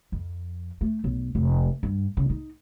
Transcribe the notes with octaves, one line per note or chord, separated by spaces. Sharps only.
F2
A3
B1
F1
G2
C#3
D#4